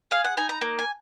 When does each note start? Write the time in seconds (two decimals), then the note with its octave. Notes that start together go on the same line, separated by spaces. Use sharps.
0.11 G#4 F5
0.24 F#5
0.37 D#4 G#5
0.49 A#5
0.61 A#3
0.79 G#5